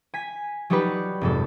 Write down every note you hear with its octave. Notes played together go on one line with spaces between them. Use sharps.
G#5 B6
F#3 G3 D#4 F#4 G4 B4
F1 G#2 A4